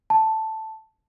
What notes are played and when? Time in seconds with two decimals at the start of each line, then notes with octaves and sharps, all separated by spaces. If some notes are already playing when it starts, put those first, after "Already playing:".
0.10 A5